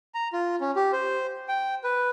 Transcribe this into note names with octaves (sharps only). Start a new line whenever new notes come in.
A#5
F4
C#4
G4
C5
G5
B4